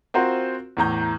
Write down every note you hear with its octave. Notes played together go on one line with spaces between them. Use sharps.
C4 F4 F#4 A#4 C5
E2 A2 A#5 G6